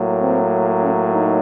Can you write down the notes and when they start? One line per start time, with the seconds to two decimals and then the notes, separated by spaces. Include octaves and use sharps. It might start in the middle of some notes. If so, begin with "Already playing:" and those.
Already playing: A2 F#3 A#3
0.21 C4
0.81 C#4
1.10 D#4